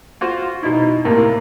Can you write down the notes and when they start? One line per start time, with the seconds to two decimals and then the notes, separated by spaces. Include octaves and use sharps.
0.21 F4 F#4 C5
0.63 B2 D#4 E4
1.05 A2 C3 A#3